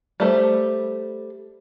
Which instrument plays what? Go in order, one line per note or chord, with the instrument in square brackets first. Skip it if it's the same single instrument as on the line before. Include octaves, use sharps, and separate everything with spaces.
[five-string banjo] G3 A3 C5